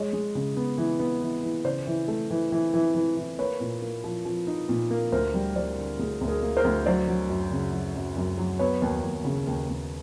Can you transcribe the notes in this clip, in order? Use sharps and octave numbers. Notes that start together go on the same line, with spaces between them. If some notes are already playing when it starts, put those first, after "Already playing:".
Already playing: G#3 C#5 D#5
G#3
C#3
B3
E3
B3
E3
E3
C#3 C5 D5
E3
A3
E3
E3
E3
E3
E3
A#3 B4 C#5
A#2
A#3
F3
F3
D#4
A#2
A#3
D2 A#4 C5
G3
G3 C5 D5
D3
D2 G#4
D2
G#4 A#4
A#3
A#4 C5
D2
F#3 C5 D5
F#3
F#2
C#3
F#3
F#2
F#2
F#3
B3 B4 C#5
D#2
D#2
C#3
D#2
D#2